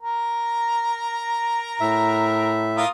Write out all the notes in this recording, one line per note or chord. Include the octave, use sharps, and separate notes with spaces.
A#4 A#5
A2 E5
A#3 F4 D#6